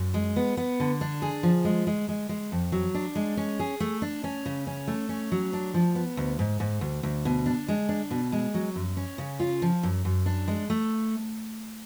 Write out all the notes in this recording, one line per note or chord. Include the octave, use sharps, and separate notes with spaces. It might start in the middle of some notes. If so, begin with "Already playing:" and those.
Already playing: F#2
G#3
B3
B3
D3
D4
G#4
F3
G#3
G#3
G#3
G#3
F2
F#3
D4
G#3
C#4
G#4
A3
D4
C#4
C#3
C#4
A3
C#4
F#3
D4
F3
B3
D2
G#2
G#2
D2
D2
B2
D4
G#3
D4
B2
G#3
F#3
F#2
C#4
C#3
F4
F3
F#2
F#2
D4
G#3
A3